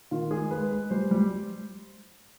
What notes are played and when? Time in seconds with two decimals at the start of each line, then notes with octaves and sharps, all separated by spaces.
0.11 D#3 F4
0.31 G#3 G#4
0.51 G#3 B4
0.71 G#3
0.90 G3 C5
1.11 G3